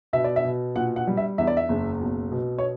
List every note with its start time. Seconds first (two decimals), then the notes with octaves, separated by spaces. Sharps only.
0.13 B2 E5
0.24 D5
0.36 E5
0.45 B2
0.76 A#2 F#5
0.96 F#5
1.07 G3
1.17 E5
1.38 E2 E5
1.47 D5
1.57 E5
1.69 F#1
2.01 B1
2.32 B2
2.58 C#5